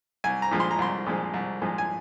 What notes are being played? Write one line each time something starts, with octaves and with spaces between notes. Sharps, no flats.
C2 G#5
A#5
A#2 F3 G#3
C6
A#5
C2 C6
A#2 F3 G#3
C2
A#2 F3 G#3
G#5